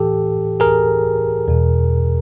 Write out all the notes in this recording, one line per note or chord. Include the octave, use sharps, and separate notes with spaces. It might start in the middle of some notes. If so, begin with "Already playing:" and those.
Already playing: A2 E3 G4 A4
G#4 A#4
E2 B2